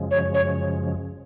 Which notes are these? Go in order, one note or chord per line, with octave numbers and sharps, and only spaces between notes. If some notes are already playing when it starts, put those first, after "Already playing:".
Already playing: F#2 C#3 F3 G#3
C#5
C#5